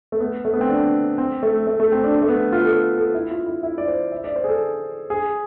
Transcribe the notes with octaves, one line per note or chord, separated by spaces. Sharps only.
A3
B3
A3
B3
C4
D4
C4
A3
A3
A3
C4
D4
A3
B3
F4
A4
A4
E4
F4
E4
E4
D5
C5
E5
D5
C5
G#4
A4
G#4